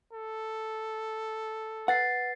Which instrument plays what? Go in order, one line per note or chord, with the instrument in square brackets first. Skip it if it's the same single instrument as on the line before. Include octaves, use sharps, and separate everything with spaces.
[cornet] A4
[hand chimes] B4 A6 C7 [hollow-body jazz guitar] F#5